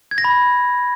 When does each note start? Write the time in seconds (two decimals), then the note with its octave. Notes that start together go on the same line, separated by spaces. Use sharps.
0.11 G#6
0.18 A#6
0.24 B5